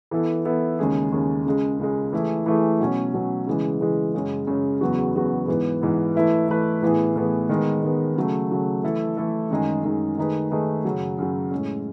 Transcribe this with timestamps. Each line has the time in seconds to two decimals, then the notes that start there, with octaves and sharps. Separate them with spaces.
0.11 E3 B3 E4 A4
0.45 E3 B3 E4 A4
0.79 D#2 C#3 G#3 C#4 G#4
1.12 D#2 C#3 G#3 C#4 G#4
1.46 C#2 C#3 G#3
1.79 C#2 C#3 G#3
2.13 E3 A3 E4 G#4
2.46 E3 A3 E4 G#4
2.80 B2 F#3 C#4
3.13 B2 F#3 C#4
3.46 C#3 E3 G#3
3.81 C#3 E3 G#3
4.14 F#2 C#3 G#3 C#4
4.47 F#2 C#3 G#3 C#4
4.81 E2 C#3 F#3 B3 F#4
5.14 E2 C#3 F#3 B3 F#4
5.48 G#2 E3 B3
5.81 G#2 E3 B3
6.15 E3 A3 E4 B4
6.48 E3 A3 E4 B4
6.82 A2 E3 B3 E4 G#4
7.16 A2 E3 B3 E4 G#4
7.49 D#3 G#3 B3
7.83 D#3 G#3 B3
8.16 C#3 F#3 A3
8.50 C#3 F#3 A3
8.84 E3 A3 E4 A4
9.17 E3 A3 E4 A4
9.50 F#2 D#3 G#3 D#4 G#4
9.84 F#2 D#3 G#3 D#4 G#4
10.17 D#3 A3 D#4 G#4 B4
10.51 D#3 A3 D#4 G#4 B4
10.85 F#2 C#3 F#3
11.18 F#2 C#3 F#3
11.51 A2 G#3 C#4